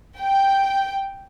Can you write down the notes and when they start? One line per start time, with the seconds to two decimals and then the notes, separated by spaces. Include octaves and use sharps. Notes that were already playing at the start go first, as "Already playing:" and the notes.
0.21 G5